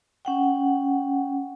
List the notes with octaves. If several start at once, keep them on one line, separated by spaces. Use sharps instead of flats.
C#4 F#5 G5